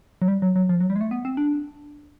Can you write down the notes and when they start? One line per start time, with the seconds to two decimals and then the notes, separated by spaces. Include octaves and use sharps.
0.22 F#3
0.28 G3
0.42 F#3
0.56 F#3
0.69 F3
0.80 F#3
0.90 G3
0.96 G#3
1.01 A3
1.11 B3
1.25 C4
1.37 D4